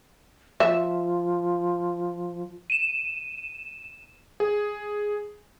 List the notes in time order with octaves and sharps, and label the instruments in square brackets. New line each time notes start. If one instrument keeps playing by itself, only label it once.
[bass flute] F3 [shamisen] E5
[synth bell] D#7 E7
[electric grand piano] G#4